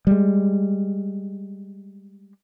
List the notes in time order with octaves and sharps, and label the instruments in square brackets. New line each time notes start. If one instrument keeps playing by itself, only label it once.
[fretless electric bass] G3 G#3